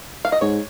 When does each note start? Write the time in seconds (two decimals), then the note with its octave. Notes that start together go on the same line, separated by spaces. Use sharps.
0.25 F5
0.32 D#5
0.41 G#2 C#5